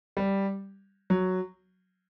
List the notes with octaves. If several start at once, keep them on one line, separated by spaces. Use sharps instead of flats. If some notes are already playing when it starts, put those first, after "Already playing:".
G3
F#3